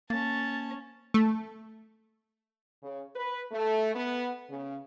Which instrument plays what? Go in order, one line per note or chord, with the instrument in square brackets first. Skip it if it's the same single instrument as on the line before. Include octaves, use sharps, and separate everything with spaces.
[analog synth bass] A#3 [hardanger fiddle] C#4 A5 [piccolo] A6
[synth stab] A3
[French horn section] C#3
B4
A3
B3
C#3